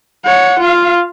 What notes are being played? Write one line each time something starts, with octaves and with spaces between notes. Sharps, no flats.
C#5 F#5
F4 F5